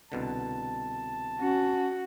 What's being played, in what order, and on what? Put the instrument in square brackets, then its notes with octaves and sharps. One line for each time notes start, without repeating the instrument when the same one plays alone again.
[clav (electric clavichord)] C2 B2 D3 [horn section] A5
[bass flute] C#4 [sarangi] F#4